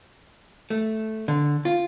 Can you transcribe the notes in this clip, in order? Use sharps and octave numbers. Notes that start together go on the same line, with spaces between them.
A3
D3
F4